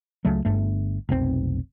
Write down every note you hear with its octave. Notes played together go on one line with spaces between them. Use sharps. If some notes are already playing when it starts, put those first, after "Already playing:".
C#2 C#3 F#3 A3
G1 G2 A3
F1 B1 C4